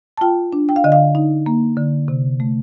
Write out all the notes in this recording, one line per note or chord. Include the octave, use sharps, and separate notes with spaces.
A5
F4 G5
D4
G5
F5
D3 D#5
F5
D#4
A#3
D3
C3
A3